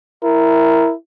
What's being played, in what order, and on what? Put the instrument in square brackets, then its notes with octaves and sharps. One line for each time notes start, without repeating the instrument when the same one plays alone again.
[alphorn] E4 [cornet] A#4